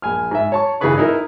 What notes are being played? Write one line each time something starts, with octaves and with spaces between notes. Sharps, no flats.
A#1 G#5 F6
G#2 E5
C#5 A5 C#6
G#1 C#3 E3 G#4 B4 C#6
D#4 E4 A#4